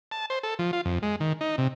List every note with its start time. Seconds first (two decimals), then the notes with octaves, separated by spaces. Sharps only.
0.11 A5
0.30 C5
0.43 A4
0.59 F3
0.73 F4
0.85 F2
1.03 G#3
1.20 D#3
1.41 D#4
1.58 C3